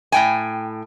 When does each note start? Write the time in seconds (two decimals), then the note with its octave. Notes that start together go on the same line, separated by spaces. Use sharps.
0.12 A2 G5 G#5